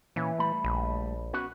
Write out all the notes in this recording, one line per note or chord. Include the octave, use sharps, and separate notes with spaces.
A#2 E3 C#4
G3 A3 B5
A#1
B3 C#4 F#4